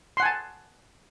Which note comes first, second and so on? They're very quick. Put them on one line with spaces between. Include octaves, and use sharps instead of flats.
C6 F#5 G#5 A5